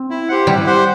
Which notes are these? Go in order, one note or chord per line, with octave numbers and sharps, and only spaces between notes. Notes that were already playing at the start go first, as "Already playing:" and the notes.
Already playing: C4
E4
G4 C5 F#5
G3 E4
G4 C5 F#5